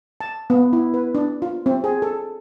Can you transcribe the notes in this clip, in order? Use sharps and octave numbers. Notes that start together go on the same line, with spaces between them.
A5
B3
E4
B4
D4
F4
C4
G#4
A4